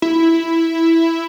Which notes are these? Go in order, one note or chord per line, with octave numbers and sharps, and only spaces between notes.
E4